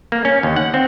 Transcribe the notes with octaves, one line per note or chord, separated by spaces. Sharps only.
A#3
C#4
D#2
F#5
C4